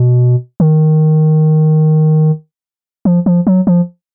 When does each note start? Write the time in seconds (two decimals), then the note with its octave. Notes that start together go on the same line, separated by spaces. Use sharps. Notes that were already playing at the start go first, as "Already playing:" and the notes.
Already playing: B2
0.60 D#3
3.05 F3
3.26 F3
3.47 F#3
3.67 F3